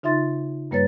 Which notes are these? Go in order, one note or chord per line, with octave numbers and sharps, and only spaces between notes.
C#3 D#4 F4 E5 C6 A6
G2 G3 A#3 B4 C#5 A6